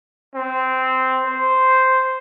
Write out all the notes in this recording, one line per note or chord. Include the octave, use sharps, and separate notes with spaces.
C4
C5